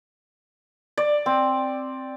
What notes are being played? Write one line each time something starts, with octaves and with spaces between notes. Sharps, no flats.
D5
C4